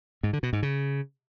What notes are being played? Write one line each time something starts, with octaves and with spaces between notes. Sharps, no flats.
G#2
D3
B2
G#2
C#3